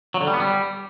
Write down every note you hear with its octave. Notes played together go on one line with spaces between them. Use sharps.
F#3
D3
G3
B3
G3